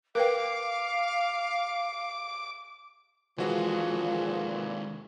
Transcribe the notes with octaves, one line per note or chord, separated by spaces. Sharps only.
A#4 B4 F5 G5 D6
D#2 A#2 E3 F3 G#3 F#4 G#4